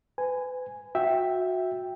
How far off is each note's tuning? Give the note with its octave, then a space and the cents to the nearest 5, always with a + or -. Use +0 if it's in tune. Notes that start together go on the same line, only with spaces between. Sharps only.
B4 +35 G#5 +0
F#4 -20 E5 +0 G5 +0